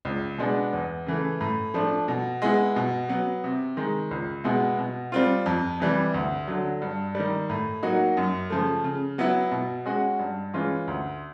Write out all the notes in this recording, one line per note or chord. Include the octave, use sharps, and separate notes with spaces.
C#2
B2 G#3 B3 D4
E2
C#3 E3 A3
A2
F3 A3 D4
B2
G#3 B3 E4
B2
F#3 B3
C3
D#3 G#3
C#2
B2 G#3 B3 E4
B2
G3 C4 F4
F2
C3 E3 G3
D2
D3 F#3
G2
D#3 G3
A2
F#3 A#3 D#4 F#4
F#2
C#3 F3 A3
C#3
F#3 B3 E4
B2
G#3 C#4 F#4
G2
E3 G#3 C#4 F4
D2